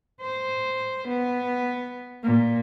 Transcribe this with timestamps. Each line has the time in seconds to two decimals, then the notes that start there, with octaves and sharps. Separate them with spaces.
0.21 C5
1.08 B3
2.24 A#2